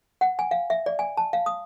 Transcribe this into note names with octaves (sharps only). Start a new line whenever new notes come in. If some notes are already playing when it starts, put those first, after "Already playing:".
F#5
G#5
F5
E5
D5
G#5
A5
F5
D#6